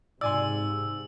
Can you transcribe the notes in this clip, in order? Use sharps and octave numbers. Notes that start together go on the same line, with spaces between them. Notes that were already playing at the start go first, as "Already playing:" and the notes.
G#2 C3 D5 G#5 C6 E6